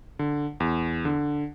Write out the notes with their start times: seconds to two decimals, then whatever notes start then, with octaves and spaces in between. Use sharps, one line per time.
0.19 D3
0.60 E2
1.05 D3